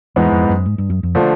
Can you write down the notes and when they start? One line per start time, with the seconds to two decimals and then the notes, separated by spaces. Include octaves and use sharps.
0.16 E2 G#2 E3 G#3 B3
0.32 F2
0.49 F#2
0.66 G#2
0.78 G2
0.90 F#2
1.03 F2
1.15 D3 F3 A3